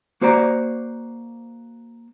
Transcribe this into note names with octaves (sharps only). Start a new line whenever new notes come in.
A#3 F#4 C5 D5 A#5